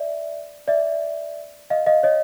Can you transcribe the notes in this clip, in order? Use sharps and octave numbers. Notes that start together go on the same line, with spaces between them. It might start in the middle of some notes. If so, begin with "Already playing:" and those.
Already playing: D5 E5
D5 E5
D#5 F5
D#5 F5
C#5 D#5